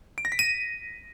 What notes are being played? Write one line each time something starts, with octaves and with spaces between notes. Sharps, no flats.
D7
A#6
B6
D#7